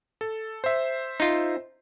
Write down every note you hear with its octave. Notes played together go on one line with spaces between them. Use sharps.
A4
C5 E5
D#4 F4